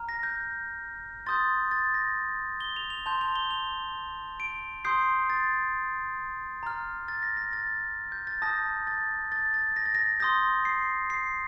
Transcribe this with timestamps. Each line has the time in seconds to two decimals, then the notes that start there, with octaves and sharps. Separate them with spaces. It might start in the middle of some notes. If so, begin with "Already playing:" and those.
Already playing: A#5 F6
0.09 A#6
0.23 G6
1.26 C6 D#6 G6 A6
1.71 A6
1.94 A#6
2.60 G7
2.76 F7
2.90 F7
3.06 A5 C6 G6 F7
3.21 F7
3.36 G7
3.51 F7
4.40 D7
4.85 C6 D#6 G6 C7
5.30 A6
6.63 A#5 F6
7.08 A6
7.23 A#6
7.37 A#6
7.53 A6
8.12 G6
8.27 A6
8.42 A5 D#6 G6 A#6
8.87 A6
9.32 A6
9.54 A6
9.76 A#6
9.86 A6
9.95 A#6
10.20 C6 D#6 G6 A#6
10.65 C7
11.10 C7